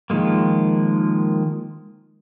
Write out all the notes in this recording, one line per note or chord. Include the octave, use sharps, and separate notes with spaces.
D#3 F3 G#3 A#3